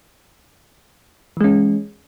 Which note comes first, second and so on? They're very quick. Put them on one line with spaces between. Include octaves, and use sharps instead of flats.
E3 G#3 C#4